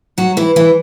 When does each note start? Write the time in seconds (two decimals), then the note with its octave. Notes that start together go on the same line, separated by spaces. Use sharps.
0.18 F#3 F#4
0.37 E3 E4
0.56 E3 E4